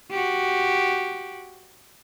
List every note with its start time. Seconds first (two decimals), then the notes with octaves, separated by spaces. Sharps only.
0.10 F#4 G4